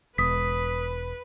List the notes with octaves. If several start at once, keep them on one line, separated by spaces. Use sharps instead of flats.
E1 B4 D#6 B6